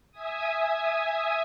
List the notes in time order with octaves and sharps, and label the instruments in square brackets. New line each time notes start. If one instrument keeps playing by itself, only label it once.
[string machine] E5 G#5 D#6